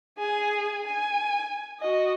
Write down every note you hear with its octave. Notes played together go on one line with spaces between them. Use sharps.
G#4 G#5
G#5
F#4 D#5